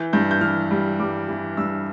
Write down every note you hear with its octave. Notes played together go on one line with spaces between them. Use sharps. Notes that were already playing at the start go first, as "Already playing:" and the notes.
Already playing: E3 G6
G2 G6
G6
E3 F6
G3
G3 D6
E3
G2 E6